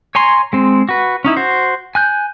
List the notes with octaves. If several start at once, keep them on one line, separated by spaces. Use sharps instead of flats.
C#5 G#5 A#5 C6
G#3 C4
F#4 B4
C#4 D#4 E4
F#4 C5
G#5 F#6 G6